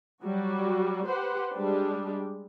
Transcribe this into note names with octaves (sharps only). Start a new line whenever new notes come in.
F#3 G3 F#4
G4 B4 C5 F#5
G3 G#3 D4 G4